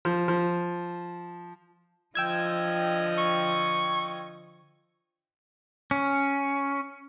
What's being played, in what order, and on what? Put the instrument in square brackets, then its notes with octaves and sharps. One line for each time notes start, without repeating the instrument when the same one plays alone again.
[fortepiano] F3
F3
[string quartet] D3 F3 D#5 [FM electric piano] G5 E6 G#6
[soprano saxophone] C#6
[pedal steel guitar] C#4